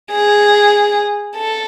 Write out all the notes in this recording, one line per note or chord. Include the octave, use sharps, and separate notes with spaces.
G#4
A4